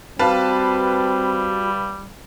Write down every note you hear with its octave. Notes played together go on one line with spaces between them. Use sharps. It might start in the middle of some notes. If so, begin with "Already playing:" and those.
G3 C4 F#4 B4 F5 A5